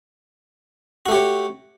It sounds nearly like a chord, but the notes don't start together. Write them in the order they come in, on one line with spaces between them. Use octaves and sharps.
F#4 A3 G4 C#5